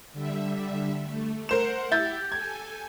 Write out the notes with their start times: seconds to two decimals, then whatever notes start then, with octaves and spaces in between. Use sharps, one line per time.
0.13 D3 G3 E5
1.05 A3
1.49 A#4 C5 F#5 E7
1.91 E4 G4 G6 A6
2.32 A4 G#5 G#6